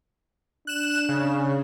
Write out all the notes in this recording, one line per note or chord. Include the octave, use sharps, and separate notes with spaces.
D4 F#6 E7
C#3